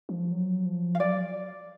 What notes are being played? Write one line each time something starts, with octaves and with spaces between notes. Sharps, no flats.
F3
F#3
F3
F5
F#3 D5